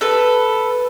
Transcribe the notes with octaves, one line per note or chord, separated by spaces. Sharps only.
A4 B4